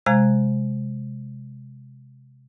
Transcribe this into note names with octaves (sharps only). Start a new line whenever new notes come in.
C3 G#3 F5 A#5 F#6 G#6